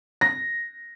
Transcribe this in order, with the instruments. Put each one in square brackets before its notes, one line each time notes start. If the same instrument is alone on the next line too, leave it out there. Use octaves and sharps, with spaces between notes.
[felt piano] A#6